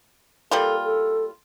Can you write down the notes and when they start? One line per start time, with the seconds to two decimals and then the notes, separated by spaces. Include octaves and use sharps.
0.51 G3 A#3 F4 A4
0.85 A4